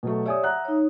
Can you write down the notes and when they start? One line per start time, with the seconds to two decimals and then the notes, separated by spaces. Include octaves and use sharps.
0.03 B2 F#3 A3
0.26 G4 C#5 D5 E5 G#5 D#6
0.44 E5 F#5 A#5 F#6
0.65 D#4 C#5